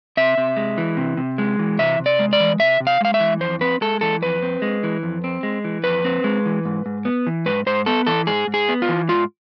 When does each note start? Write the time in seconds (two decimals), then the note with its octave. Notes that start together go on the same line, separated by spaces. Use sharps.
0.17 C3 E5
0.38 C3
0.57 G#3
0.78 E3
0.97 C3
1.17 C3
1.38 G#3
1.59 E3
1.79 C3 E5
2.00 C3
2.06 D5
2.19 G#3
2.33 D5
2.40 E3
2.59 C3 E5
2.80 C3
2.87 F5
3.01 G#3 F5
3.14 E5
3.20 E3
3.40 F2 C5
3.61 C4 B4
3.81 G#3 A4
4.01 E3 A4
4.22 F2 B4
4.42 C4
4.62 G#3
4.83 E3
5.03 F2
5.24 C4
5.43 G#3
5.64 E3
5.84 F2 B4
6.04 C4
6.24 G#3
6.46 E3
6.65 G#2
6.86 G#2
7.05 B3
7.27 E3
7.46 G#2 B4
7.66 G#2 C5
7.86 B3 A4
8.07 E3 A4
8.27 G#2 G#4
8.47 G#2
8.54 G#4
8.68 B3
8.82 F4
8.89 E3
9.09 G#2 F4